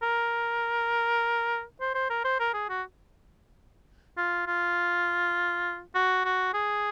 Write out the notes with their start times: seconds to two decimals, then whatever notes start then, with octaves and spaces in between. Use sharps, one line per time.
0.03 A#4
1.81 C5
1.95 C5
2.10 A#4
2.25 C5
2.40 A#4
2.54 G#4
2.69 F#4
4.18 F4
4.47 F4
5.95 F#4
6.25 F#4
6.54 G#4